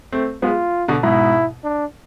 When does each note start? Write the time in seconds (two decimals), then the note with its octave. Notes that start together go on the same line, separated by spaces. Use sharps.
0.12 A3 C4
0.42 G#3 B3 F4
0.88 B2 D3
1.03 G#2 B2 E4
1.64 D4